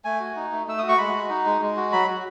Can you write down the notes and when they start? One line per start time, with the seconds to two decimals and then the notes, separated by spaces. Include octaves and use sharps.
0.05 A3 G#5
0.20 F#4
0.36 D#4
0.52 A3
0.67 A3 E6
0.79 F#4 D#6
0.89 C#6
0.98 G#3 B5
1.14 F#4
1.29 D#4
1.45 G#3
1.61 G#3
1.76 F#4
1.92 F#3 B5
2.08 F#4